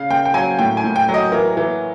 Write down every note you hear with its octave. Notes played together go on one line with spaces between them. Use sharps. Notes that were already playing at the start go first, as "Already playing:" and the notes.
Already playing: C#3 F5
C#3 G5
G5
F#3 G#5
A2 G5
G#5
A2
G5
F#3
D#5
E3 A#4
E3